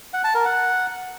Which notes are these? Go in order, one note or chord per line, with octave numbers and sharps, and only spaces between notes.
F#5
A5
A#4
F#5